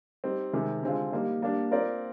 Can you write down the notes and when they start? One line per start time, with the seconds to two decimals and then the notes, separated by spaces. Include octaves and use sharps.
0.24 G3 C4 D#4
0.53 C3 D#3 G#3
0.83 D3 G#3 C4 F4
1.12 G3 A#3 D#4
1.42 G3 A#3 D4
1.71 C4 F4 A#4 D5